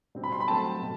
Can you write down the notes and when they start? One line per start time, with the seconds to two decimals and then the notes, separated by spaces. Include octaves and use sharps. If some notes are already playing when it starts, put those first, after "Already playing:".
0.15 B2 G3 C4
0.24 B5
0.32 C6
0.40 B5
0.48 F#3 A3 C4 A5
0.82 B2